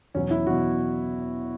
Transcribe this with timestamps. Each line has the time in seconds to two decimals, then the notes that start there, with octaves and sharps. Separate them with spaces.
0.14 E2 B2 F#3 C#4
0.31 E4
0.47 E2 B2 F#3 F#4